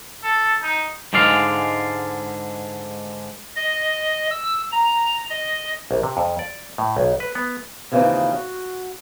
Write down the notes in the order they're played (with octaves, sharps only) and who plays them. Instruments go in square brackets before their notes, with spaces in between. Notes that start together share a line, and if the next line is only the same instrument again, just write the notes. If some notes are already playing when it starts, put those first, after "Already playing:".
[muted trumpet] A4
D#4
[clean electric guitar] G#2 D3 G#3 D5 F5
[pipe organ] D#5
E6
A#5
D#5
[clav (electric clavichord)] A#1
C3
F2
D5
A2
B1
B4
B3
[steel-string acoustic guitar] D#2 C#3 E3 F3 C4 D#4
F#4